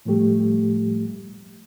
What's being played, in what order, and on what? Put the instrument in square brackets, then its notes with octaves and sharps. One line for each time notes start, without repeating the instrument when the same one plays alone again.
[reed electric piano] A2 F3 G3 A3 G4